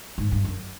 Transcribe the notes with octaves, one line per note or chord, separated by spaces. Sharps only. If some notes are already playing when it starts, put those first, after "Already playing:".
G#2
G2
F#2